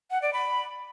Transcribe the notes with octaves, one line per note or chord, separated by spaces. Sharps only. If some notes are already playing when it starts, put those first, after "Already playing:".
F#5
D5
B5